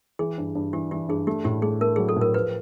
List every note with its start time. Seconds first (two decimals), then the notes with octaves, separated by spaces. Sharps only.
0.19 E3 G#4
0.38 G2
0.55 G2
0.73 E3 G4
0.91 E3 G4
1.09 G2 G#4
1.27 A3 G4
1.45 A2 G4
1.62 A3 G#4
1.81 A3 A#4
1.96 F#3 G#4
2.09 A4
2.16 A2
2.21 A#4
2.34 F3 B4